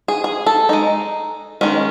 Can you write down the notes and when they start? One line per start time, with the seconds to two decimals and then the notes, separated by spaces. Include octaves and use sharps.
0.08 G#4
0.24 G#4
0.46 A4
0.69 G#3 D#4
1.61 D#3 G#3 C#4